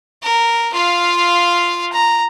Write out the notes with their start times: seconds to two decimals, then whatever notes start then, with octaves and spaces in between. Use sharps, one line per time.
0.22 A#4
0.74 F4 F5
1.93 A#5